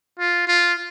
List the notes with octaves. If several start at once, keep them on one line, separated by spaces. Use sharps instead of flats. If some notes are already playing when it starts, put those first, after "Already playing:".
F4
F4